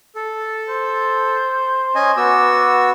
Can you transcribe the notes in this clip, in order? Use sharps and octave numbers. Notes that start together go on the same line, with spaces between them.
A4
C5
C#4 D#5 G#5
B3 F#4 D6 E6